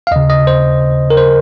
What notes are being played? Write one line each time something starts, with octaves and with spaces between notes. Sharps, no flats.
F5
D#2 C#3 D#5
D#5
C5
A#4
C5